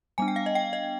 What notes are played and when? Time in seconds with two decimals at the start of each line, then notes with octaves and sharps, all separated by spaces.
0.18 G3 B3 D4 G#5
0.28 G5
0.36 F5
0.46 D#5
0.55 G5
0.73 D#5